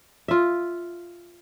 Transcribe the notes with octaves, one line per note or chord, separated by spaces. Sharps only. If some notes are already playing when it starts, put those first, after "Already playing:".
F4 E5